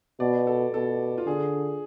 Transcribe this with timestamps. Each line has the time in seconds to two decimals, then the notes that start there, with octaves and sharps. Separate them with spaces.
0.20 B2 D5
0.47 A4
0.74 B2 A4
1.18 F4
1.27 D3 G#4